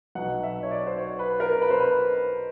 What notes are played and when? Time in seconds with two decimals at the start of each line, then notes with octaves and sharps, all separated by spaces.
0.15 B1 B2 F#3 F#5
0.43 E5
0.63 C#5
0.71 D5
0.87 C5
0.98 C#5
1.19 B4
1.40 A#4
1.62 B4
1.70 C5
1.80 B4